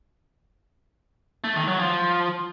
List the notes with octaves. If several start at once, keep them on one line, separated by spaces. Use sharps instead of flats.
A3
D#3
F#3
F3